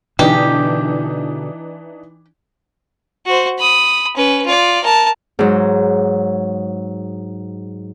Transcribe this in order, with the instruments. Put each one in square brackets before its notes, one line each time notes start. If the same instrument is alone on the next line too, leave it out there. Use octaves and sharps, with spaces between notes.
[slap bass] B2 D3 [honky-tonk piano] E3 D4 D#4 [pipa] G4
[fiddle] F#4 C5
B5 D#6
C#4 B4
F4 D5
A#4 A5
[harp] G#2 F#3